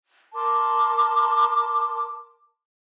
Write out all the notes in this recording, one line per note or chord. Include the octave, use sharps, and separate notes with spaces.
A#4 A5 C6 D6